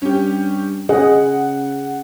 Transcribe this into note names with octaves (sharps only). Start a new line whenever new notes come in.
G2 C#4 G4
C#3 G#4 D#5 F#5